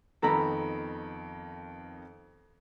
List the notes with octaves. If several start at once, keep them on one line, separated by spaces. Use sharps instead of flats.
F2 D#3 B3 A4 A#5 B5